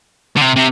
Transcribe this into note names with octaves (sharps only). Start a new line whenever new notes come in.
D3
C3
C3